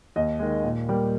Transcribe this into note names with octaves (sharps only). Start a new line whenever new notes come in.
D#2 D#5
D#3 G#3
A#2
G3 A#3